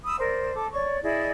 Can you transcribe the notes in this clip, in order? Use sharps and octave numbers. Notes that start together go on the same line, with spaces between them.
B5 D#6 E6
A#4 C5 D5
A4 D6
C#5 D5 C#6
E4 G#4 D5 D#5